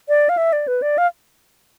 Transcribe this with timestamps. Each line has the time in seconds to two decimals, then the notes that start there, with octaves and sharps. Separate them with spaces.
0.09 D5
0.29 F5
0.37 E5
0.53 D5
0.68 B4
0.82 D5
0.98 F5